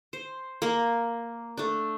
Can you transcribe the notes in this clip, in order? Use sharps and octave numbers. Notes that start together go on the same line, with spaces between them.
C5
A#3 A#4
A3 D4